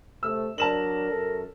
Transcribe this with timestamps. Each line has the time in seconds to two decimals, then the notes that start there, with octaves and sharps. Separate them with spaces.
0.23 C3 A3 E6
0.58 F#3 D4 A#4 A5 E7 F#7
1.10 F#2 C#4 A4